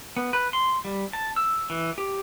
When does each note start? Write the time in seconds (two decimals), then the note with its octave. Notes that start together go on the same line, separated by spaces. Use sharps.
0.17 B3
0.33 B4
0.53 C6
0.85 G3
1.13 A5
1.36 E6
1.70 E3
1.98 G4